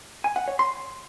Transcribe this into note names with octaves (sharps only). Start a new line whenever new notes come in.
G#5
F#5
C#5
C6